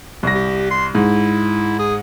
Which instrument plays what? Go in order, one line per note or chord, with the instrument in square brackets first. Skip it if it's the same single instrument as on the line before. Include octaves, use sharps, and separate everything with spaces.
[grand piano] C2 A#6
[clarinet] G4
C6
[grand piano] G#2 [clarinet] E4
[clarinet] G#4